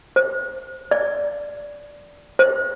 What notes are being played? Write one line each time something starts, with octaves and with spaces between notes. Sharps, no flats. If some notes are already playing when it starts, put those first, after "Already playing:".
C5
D5
C5